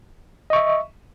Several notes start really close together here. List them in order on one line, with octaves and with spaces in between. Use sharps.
D#5 C#6 E5